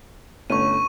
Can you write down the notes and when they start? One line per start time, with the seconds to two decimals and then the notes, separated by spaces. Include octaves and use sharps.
0.50 G1 A3 C#4 C#6 D#7